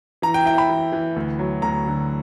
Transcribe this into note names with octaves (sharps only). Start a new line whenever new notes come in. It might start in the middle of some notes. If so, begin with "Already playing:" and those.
E3 A#5
G5
E4 G5
B5
E3
E3
D2
F#3
D2 A#5
D3